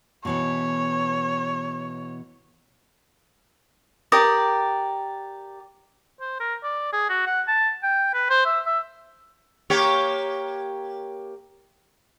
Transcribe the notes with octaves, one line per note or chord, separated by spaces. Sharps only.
B2 E3 B3 C#5
G4 A#4 D5 D#6
C5
A#4
D5
G#4
F#4
F#5
A5
G5
B4
C5
E5
E5
A#3 G4 C#5